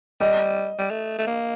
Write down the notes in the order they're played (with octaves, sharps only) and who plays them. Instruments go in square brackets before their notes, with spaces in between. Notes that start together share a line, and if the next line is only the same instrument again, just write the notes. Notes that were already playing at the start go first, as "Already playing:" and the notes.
[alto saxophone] G3 [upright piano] D#5
[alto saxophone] G3
A3
A3
A#3